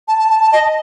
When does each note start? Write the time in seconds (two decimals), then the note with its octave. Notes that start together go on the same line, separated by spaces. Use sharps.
0.08 A5
0.19 A5
0.30 A5
0.42 A5
0.52 D#5